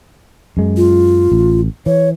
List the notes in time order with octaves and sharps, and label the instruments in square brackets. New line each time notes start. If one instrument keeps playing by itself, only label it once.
[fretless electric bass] F#2 G#3
[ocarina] F4
[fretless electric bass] A1
[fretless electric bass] E3 [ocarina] C#5